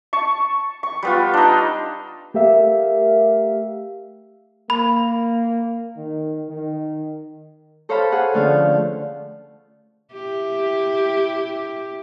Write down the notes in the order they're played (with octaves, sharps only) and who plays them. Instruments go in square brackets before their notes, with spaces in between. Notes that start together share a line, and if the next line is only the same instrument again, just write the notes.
[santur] A5 C#6
C#6
G3 B3 F4
D4 D#4
[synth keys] A3 G4 A#4 E5 F5
[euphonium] A#3 [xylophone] B5
[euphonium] D#3
D#3
[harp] A4 C5 C#5 F5 B5
G#4 F#5
D3 F3 A3 C#4 F5 F6
[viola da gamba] E4 G4